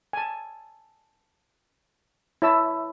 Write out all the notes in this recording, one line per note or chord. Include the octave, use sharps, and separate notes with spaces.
G#5 A5
E4 C#5 E5 A5 E6